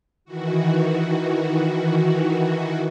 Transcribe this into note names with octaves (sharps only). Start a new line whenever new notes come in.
D#3 E3 F#4